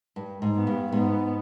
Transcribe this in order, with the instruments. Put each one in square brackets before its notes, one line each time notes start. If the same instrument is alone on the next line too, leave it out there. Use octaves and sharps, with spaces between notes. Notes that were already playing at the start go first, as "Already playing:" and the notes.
[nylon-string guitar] G2
G#2
[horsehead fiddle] B3
[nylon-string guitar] G2
[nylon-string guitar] G#2 [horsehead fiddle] B3